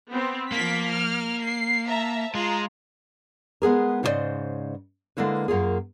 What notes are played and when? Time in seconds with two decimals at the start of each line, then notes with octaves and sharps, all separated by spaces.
0.11 B3 C4
0.52 F3 A#3 B6
0.89 F6
1.43 C7
1.87 E5 A5 A#5
2.35 G#3 F4 A#5
3.62 G#3 B3 G#4 A#4
4.03 G#2 C#3 E4 C5 D5 D#5
5.17 D3 G#3 A#3 E4 B4
5.48 F#2 A#3 F4 G#4